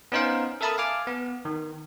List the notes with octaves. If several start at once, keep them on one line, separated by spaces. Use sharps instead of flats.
B3 C#4 D#4 C5 F5
A4 A#4 E5 A5 B5 D#6
F5 G#5 D6 F6
B3
D#3